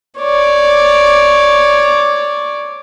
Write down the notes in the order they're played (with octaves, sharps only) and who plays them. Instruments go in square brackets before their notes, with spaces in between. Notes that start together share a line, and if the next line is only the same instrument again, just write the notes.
[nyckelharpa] C#5 D5